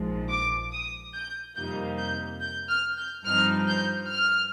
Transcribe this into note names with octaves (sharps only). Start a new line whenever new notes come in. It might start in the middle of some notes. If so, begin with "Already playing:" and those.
Already playing: A#1 G#2 F3 G#3
D6
D#6
G6
F2 C3 G3 A#3 D#4 G6
G6
G6
F6
G6
G2 F3 C4 D#4 F6
G6
F6